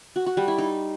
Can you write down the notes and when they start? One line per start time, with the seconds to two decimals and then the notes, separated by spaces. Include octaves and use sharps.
0.16 F#4
0.26 F#4
0.37 G3
0.48 E4
0.58 D#4